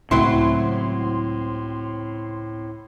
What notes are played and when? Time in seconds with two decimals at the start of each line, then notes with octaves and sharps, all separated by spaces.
0.11 C#2 A2 F#3 C4 E4 C6